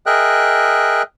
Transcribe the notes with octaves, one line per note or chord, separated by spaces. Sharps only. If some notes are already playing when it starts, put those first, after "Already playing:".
G#4 A#4 D#5 E5 G5 F#6